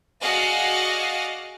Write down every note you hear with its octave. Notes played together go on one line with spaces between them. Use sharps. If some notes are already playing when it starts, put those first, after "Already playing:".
F#4 G#4 D5 D#5 F5 F#5